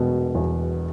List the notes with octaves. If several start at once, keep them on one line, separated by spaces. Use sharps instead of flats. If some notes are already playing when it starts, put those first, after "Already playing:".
Already playing: E1 B2
E2